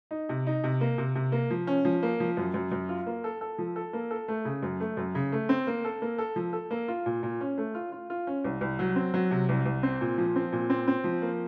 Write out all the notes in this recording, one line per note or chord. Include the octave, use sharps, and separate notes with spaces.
D#4
C3
D#4
C3
A#3
C3
C3
A#3
F3
C#4
F3
A#3
F3
F#2
F#2
F#2
F4
A#3
A4
A4
F3
A4
A#3
A4
A3
C#3
F#2
A3
F#2
C#3
A3
C4
A#3
A4
A#3
A4
F3
A4
A#3
F4
A#2
A#2
C#4
A3
F4
F4
F4
C#4
C2
C2
F#3
C4
F#3
C3
C2
C2
C4
A#2
F3
C4
A#2
C4
C4
F3
A#3